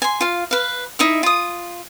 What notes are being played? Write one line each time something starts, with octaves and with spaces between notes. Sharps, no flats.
G#5 C6
F4 F5
B4 F5
D#4 E4 E5
F4 D#6